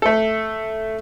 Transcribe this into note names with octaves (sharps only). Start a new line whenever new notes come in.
A3 A4